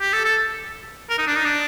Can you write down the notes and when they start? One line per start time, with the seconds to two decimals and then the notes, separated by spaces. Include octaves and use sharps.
0.01 G4
0.13 A4
0.25 A4
1.10 A#4
1.18 D#4
1.27 D4
1.36 D#4
1.45 D4